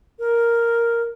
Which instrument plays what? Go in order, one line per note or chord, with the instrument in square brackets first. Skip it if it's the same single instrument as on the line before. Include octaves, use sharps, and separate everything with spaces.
[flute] A#4